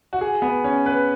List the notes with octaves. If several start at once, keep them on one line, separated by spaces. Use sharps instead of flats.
F#4
G#4
B3
C#4
B4